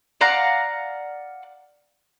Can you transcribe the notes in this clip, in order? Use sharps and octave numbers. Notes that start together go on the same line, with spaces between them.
D5 F5 F#5 A#5